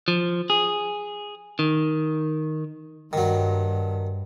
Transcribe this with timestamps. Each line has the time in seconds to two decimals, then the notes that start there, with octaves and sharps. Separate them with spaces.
0.08 F3
0.50 G#4
1.59 D#3
3.13 G2 D#3 F#3